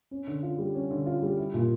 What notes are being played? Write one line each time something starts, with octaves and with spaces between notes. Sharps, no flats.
C#4
D3
F4
G3
C#4
D3
F4
G3
E4
A#2